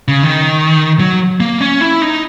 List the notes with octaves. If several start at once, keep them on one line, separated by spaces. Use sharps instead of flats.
C#3
D#3
F#3
A#3
C#4
E4
D#4